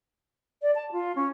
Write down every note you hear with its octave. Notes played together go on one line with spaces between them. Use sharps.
D5
A5
F4
C#4